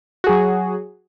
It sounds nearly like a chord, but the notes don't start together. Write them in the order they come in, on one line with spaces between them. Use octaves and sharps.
F#4 G#4 F#3